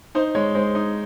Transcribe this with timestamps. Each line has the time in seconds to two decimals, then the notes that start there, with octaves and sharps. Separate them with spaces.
0.15 D#4 C5
0.35 G#3 C#5
0.55 G#3 C5
0.75 D#4